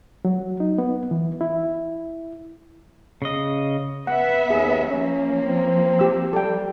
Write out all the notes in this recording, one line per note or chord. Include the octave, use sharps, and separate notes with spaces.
F#3
D#4
B3
E3
E4
C#3 D#5
B3 E5 F#5
D#2 G#4
F3 A#3 C#4
C4
G4 E6
G3 A4 G5